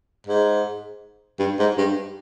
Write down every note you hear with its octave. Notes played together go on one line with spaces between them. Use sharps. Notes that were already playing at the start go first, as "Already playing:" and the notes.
G#2
G2
G#2
G2